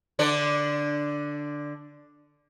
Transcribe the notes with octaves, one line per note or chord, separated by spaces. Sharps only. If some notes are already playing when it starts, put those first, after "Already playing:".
D3 D4 D5